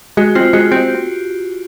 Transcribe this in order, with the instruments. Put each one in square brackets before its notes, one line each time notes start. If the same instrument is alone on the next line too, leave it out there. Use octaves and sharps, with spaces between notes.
[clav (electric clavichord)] G#3 [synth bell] F#4
[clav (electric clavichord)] C4 [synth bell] F4
[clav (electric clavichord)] G#3 [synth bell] F#4
[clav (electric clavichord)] C4 [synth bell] G4